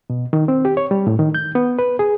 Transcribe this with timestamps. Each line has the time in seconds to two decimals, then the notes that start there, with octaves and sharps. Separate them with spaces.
0.10 B2
0.33 D#3
0.48 C4
0.65 G4
0.77 C#5
0.91 G3
1.07 A2
1.19 D#3
1.35 G6
1.55 B3
1.79 B4
1.99 G#4